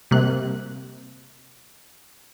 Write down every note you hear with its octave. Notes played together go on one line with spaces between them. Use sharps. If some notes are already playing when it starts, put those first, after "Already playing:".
C3 G3 A#3 F#6